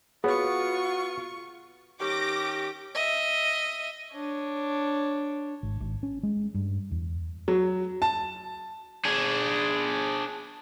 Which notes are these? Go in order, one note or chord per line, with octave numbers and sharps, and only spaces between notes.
B3 F4 F#4 G#4 C#5 C#6
D#3 C#4 G4 D6 A#6
D#5 E5
D4 C#5
G#1
G#1
C#4
G#3
G2
E2
F#3
A5
D4 G#4